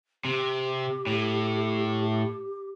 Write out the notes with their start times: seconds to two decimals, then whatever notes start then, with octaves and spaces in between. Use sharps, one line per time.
0.25 C3 G4
1.07 A2